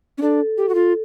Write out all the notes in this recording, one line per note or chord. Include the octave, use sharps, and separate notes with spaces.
C#4
D4 A4
G4
F#4
F4